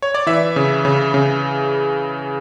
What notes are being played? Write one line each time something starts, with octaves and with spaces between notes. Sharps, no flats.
C#5
D5
E3 E5
C#3
C#3
C#3